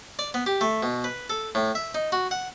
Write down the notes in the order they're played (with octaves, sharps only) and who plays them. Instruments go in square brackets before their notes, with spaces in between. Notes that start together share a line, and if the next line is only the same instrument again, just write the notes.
[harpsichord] D5
B3
G4
A3
B2
B4
A4
A2
E5
D#4
F#4
F#5